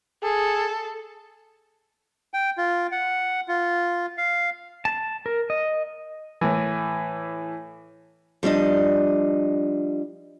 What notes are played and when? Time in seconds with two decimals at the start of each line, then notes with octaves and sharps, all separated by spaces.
0.23 G#4 A4
2.34 G5
2.58 F4
2.92 F#5
3.48 F4
4.18 F5
4.85 A5
5.26 A#4
5.50 D#5
6.41 A2 E3
8.43 F3 G3 D4 D#5